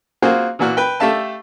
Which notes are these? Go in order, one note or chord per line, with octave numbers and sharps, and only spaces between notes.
A#3 C4 F4 F#4 G#4 C5
A#2 E3 A#3 F#4
B4 G5
A3 G4 E5 F5 A5